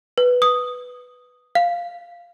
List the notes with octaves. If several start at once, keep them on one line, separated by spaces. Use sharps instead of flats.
B4
D#6
F5